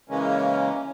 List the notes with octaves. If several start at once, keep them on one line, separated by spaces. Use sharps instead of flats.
C#3 E3 G#3 A#3 C#4